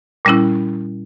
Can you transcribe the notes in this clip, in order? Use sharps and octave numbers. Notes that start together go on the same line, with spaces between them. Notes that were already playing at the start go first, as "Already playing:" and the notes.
A#2 G3 C#4 E4